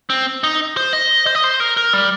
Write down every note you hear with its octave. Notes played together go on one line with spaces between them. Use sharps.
C4
D#4
C5
D#5
C5
D#5
C5
A#4
A#4
G3